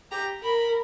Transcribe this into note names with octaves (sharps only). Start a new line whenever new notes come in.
G4 A#5
A#4 B5